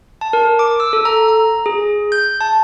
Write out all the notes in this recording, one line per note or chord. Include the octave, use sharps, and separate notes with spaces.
A5
A#4
D6
E6
A4
A#5
A#5
G#4
G6
A5